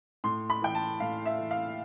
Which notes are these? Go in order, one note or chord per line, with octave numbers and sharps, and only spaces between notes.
A2 C6
B5
E3 G5
A5
A2 F5
E5
E3
F5